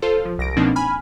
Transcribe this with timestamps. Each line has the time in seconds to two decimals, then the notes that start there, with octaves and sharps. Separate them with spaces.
0.02 F4 A4 C5
0.25 F3
0.38 C2 A#6 D7
0.57 B2 F3 A#3 C4 D4 D#4
0.76 G#5 B5 F6